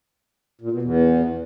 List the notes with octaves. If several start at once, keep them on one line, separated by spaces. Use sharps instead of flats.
A#2
B2
E2